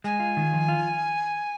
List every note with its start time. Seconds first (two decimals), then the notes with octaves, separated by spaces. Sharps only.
0.04 G#3 G#5
0.20 F4
0.37 D#3
0.53 F3
0.68 F4